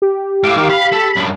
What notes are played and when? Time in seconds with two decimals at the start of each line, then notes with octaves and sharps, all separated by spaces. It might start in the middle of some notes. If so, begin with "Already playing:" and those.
0.02 G4
0.44 A2 F5 D6
0.57 D#3
0.70 F5 B5
0.92 A4
1.16 F#2 D4